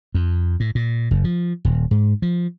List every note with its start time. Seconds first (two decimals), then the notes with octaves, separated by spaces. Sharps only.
0.15 F2
0.60 A2
0.75 A#2
1.11 F#1
1.24 F3
1.65 D#1
1.91 G#2
2.22 F3